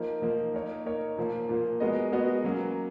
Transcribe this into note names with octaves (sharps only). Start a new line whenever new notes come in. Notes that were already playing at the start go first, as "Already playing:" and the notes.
Already playing: F3 A#3 D#4 A#4
F3 A#3 D#4 A#4
A#3 D#4 A#4 C#5
A#3 D#4 A#4 C#5
A#2 F3 A#3
A#2 F3 A#3
G#3 B3 F#4 A#4 D#5
G#3 B3 F#4 A#4 D#5
F#3 A#3 C#4